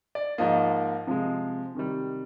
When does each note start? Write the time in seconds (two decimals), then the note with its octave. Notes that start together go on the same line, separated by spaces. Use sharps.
0.15 D5
0.38 G#2 F3 A#3 D#5
1.07 C3 F3 G#3
1.75 C3 D#3 G3